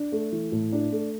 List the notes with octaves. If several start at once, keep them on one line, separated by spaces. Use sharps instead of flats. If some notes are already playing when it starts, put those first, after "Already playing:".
Already playing: D4
A3
E3
A2
D4
A3